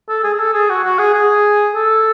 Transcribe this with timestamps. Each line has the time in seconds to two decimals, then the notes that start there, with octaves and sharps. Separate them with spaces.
0.09 A4
0.24 G#4
0.34 G#4
0.39 A4
0.54 G#4
0.69 F#4
0.84 F#4
0.99 G#4
1.14 G#4
1.75 A4